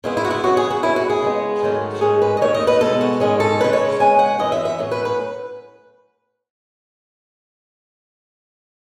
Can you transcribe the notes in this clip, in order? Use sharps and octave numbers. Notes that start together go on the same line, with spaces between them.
C#3 G#3 B3 E4
E4
F#4
E4
E2 C#3 F#3 B3 F#4
G#4
F#4
D#2 C#3 F#3 C#4 E4
F#4
G#4
C#3 G#3 B3
G#2 D#3 F#3 A3 C#4
G#2 D#3 G#3 C#4 G#4
B4
D#5
D#2 D#3 A3 C#5
D#5
B4
B2 G#3 B3 A4
F#4
G#2 D#3 G#3 C#4 G#4
A4
C#3 G#3 C#4 B4
C#5
C#3 G#3 C#4 G#5
F#5
F#2 E3 B3 D#5
E5
E5
A2 F#3 C#4
B4
B4